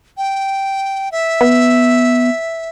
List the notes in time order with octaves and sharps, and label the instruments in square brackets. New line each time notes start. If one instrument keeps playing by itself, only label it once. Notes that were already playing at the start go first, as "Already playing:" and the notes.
[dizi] G5
E5
[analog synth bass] B3